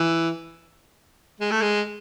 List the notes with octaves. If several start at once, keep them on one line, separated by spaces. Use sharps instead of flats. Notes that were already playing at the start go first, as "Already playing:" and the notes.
Already playing: E3
G#3
A3
G#3